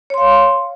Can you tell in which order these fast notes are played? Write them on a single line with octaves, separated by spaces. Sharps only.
C#5 C6 F5